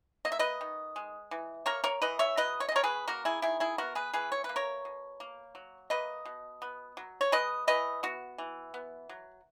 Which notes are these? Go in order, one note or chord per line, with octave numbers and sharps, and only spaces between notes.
A#3 D#5
E5
B4 D#5
D#3
G#3
E3
A#3 A#4 C#5
A#4 C#5
E3 B4 D#5
C#5 E5
F#3 B4 D#5
C#5
D#5
C#3 A#4 C#5
G#4 B4
A#3 F#4 A#4
E4 G#4
D#3 E4 G#4
E4 G#4
B3 F#4 A#4
G#4 B4
E3 G#4 B4
C#5
A#3 B4
A#4 C#5
B2
A#3
F#3
A#3 B4 D#5
B2
B3
F#3
C#5
G#3 B4 D#5
E3 B4 D#5
B3 F#4
E3
B3
F#3